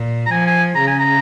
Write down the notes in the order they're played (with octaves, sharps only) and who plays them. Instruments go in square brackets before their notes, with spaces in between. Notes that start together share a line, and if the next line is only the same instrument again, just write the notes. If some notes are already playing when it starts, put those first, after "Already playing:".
Already playing: [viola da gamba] A#2
[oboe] A#5
[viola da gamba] F3 [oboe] G#5
[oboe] G#5
[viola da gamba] C#3 [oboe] A#5
[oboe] G#5
A#5